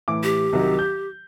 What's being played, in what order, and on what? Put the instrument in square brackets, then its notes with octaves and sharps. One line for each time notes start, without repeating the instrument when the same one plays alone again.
[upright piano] A2 E3 D6
[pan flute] G4
[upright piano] C2 D#3 F#3
G6